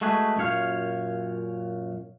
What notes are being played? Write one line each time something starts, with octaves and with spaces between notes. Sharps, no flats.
G#3 A3 F#4 G#4 B4
F#2 A#2 C#5 F5